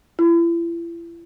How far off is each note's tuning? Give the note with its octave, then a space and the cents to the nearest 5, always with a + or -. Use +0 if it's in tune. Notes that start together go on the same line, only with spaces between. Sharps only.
E4 +40